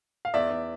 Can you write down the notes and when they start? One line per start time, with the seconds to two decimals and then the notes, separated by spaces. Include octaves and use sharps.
0.25 F5
0.34 E2 D5 E5
0.50 E2